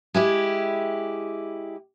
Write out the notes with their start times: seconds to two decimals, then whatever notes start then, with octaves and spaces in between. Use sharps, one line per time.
0.14 G#3 E4 G4